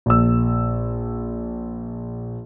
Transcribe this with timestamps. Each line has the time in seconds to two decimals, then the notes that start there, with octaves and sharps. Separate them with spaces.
0.06 A#1 E6